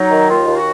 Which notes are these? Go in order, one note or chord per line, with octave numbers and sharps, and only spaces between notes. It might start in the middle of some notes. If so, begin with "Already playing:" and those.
Already playing: F#3 D#4
D#3
D#2 F4
D#2
F#4